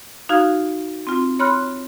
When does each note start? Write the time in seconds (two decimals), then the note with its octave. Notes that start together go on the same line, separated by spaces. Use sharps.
0.29 D#4 F#4 F5 F6 G#6
1.07 C4 F4
1.39 C#5 B5 C6 F6 F#6